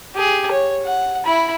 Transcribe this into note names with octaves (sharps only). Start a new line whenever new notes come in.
G4 G#4
C#5
F#5
E4 B5